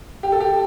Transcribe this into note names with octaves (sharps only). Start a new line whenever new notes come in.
G4
A4
G4